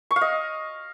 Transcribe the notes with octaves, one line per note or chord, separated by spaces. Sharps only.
C#6
F5
D#5